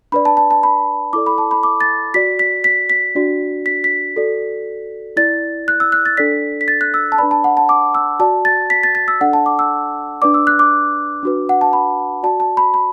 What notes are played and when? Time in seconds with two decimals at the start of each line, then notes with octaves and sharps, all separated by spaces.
0.12 D4 B4 D5 B5
0.25 A5
0.37 A5
0.51 A5
0.63 B5
1.13 E4 A4 D5 D6
1.26 B5
1.38 A5
1.51 B5
1.63 D6
1.81 A6
2.14 F#4 D5 B6
2.39 B6
2.64 B6
2.90 B6
3.15 D4 F#4 D5
3.66 B6
3.84 B6
4.16 F#4 A4 D5
5.17 E4 D5 A6
5.68 F#6
5.80 E6
5.92 F#6
6.06 A6
6.17 D4 A4 D5 B6
6.61 B6
6.68 A6
6.81 F#6
6.94 E6
7.12 A5
7.18 D4 B4 D5 B5
7.31 A5
7.44 F#5
7.57 A5
7.69 D6
7.95 E6
8.20 F#4 D5 A5
8.45 A6
8.70 B6
8.83 A6
8.95 A6
9.08 E6
9.20 D4 A4 D5 F#5
9.33 A5
9.46 D6
9.59 E6
10.22 D4 B4 D5 D6
10.34 E6
10.47 F#6
10.59 D6
11.23 D4 F#4 B4
11.49 F#5
11.61 A5
11.73 B5
12.23 F#4 D5 A5
12.40 A5
12.57 B5
12.74 B5